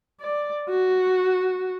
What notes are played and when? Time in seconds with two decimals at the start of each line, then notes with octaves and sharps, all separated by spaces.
0.21 D5
0.69 F#4